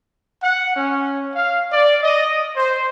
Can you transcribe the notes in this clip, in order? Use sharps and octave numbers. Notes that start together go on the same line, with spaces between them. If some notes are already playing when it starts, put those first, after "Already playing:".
F#5
C#4
F5
D5
D#5
C5